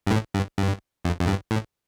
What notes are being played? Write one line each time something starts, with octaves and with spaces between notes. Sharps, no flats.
G2
A2
G2
G2
F2
F2
G2
A2